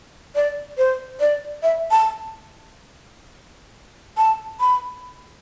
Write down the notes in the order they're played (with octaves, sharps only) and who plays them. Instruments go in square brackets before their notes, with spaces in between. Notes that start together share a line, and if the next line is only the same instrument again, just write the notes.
[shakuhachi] D5
C5
D5
E5
A5
A5
B5